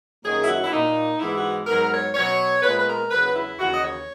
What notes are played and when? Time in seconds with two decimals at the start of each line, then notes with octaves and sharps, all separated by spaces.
0.23 F#2 D#3 F#3 A#3 G#4
0.42 E4
0.47 F#4
0.64 E4
0.72 A#2 A#3 D#4
1.19 G#2 E3 G#3 B3 E4
1.36 F#4
1.67 G#2 F#3 B3 A#4
1.91 C#5
2.15 B2 F#3 B3 C#5
2.63 A#2 G#3 B3 B4
2.77 B4
2.87 A#4
3.10 E2 C#3 F#3 B3 B4
3.35 E4
3.59 D#2 C#3 E3 F#4
3.73 D#5
3.82 C#5